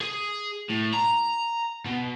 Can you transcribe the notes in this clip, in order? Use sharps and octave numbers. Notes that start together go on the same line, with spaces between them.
G#4
A2
A#5
B2